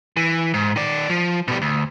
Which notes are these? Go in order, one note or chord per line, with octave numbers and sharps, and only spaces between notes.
E3
G#2
D#3 D5
F3
B2 G3
D2